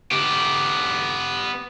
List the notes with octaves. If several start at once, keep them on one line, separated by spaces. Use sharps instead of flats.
B3 G4